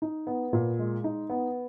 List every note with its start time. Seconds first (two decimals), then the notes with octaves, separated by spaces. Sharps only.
0.02 D#4
0.27 B3
0.53 A#2
0.79 G#3
1.04 D#4
1.30 B3